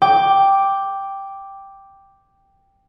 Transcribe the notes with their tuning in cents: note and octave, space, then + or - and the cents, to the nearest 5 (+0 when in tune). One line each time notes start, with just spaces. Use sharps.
G5 +0 D6 +0